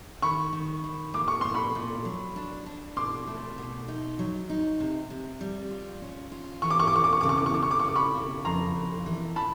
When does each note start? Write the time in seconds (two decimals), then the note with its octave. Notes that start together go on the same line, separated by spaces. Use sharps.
0.22 D#3 B5 C#6
0.53 D#3
0.84 D#3
1.14 A#2 D6
1.28 C#6
1.41 A#2 C6
1.54 B5 C#6
1.75 A#2
2.05 F#3
2.36 D4
2.66 D4
2.96 B2 C6 D6
3.27 A3
3.58 B2
3.88 D#4
4.19 F#3
4.50 D#4
4.80 C3
5.10 C3
5.41 G3
5.71 F4
6.02 C#4
6.32 F4
6.62 E3 C#6
6.70 D6
6.80 C#6
6.87 D6
6.93 E2 C#6
7.04 D6
7.13 C#6
7.21 C#3 D6
7.29 C#6
7.38 D6
7.46 C#6
7.54 C#3 D6
7.63 C#6
7.71 D6
7.79 C#6
7.85 C#3 D6
7.96 B5 C#6
8.15 C#3
8.45 F2 A#5 C6
8.76 F2
9.06 E3
9.36 A#2 A5 B5